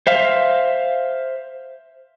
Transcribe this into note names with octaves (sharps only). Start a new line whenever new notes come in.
C5 E5 F5